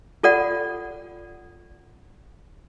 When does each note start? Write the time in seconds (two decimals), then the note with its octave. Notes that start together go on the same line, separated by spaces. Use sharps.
0.23 F4 A4 D5 F#5